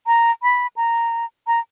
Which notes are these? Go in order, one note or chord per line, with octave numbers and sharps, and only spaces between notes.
A#5
B5
A#5
A#5